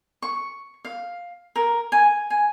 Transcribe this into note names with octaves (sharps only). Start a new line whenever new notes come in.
C#6
F5
A#4
G#5
G#5